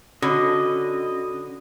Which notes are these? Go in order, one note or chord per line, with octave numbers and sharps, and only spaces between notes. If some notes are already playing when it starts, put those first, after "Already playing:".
D3 C#4 F#4 D#5 B5